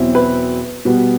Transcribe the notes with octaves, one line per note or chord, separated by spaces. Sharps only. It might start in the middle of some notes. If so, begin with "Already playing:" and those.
Already playing: E2 B2 F#3 C4 E4
B4
B2 G3 B3